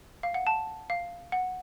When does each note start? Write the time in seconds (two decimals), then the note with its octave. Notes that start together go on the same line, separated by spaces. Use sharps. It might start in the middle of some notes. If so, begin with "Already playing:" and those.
0.23 F5
0.34 F#5
0.47 A5
0.90 F5
1.32 F#5